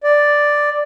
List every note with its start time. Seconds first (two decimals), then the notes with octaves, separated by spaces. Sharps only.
0.04 D5